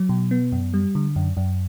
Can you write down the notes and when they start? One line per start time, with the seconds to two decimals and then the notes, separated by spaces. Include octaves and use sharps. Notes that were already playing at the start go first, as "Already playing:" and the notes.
Already playing: F#3
0.09 B2
0.31 B3
0.52 F#2
0.74 G3
0.95 D3
1.16 F#2
1.37 F#2